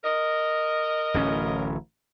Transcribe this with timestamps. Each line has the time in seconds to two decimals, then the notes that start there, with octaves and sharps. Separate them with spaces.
0.04 A#4 D#5
1.14 D1 A1 C#4